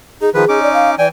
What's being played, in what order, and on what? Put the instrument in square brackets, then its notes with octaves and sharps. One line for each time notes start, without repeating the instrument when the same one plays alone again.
[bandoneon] D#4 [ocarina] G#4
[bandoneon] D#3 F3 B4 [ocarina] G#4
[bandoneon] C#4 D#4 D6
[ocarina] D5
F5
[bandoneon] E3 G5 G#5 [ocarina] D5